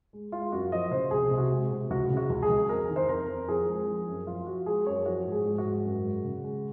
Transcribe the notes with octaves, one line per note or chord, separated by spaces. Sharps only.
G#3
G#3 F4
F#2 F#4
F3 D#5
C#3 C5
C2 G#4
C3
F#4
G#3
C3
C#2 F#4
C#3
F#4
C#2
G#4
C#2
F2 A#4
D#3
C5
F2 A#4
F2
F3 G#4
G#3
F3
F#2
F3 F4
F3 F#4
G#3 G#4
F#2 C#5
F3 F#4
G#2
G#4
G#2
F#4
G#2
F#2
G#3
C#3
G#3